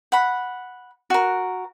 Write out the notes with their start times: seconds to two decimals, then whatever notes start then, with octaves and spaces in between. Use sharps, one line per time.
0.12 F#5 B5
1.10 F#4 A#4